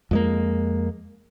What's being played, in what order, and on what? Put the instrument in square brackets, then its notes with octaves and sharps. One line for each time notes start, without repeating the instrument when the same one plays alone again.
[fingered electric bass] F2 G#3 A#3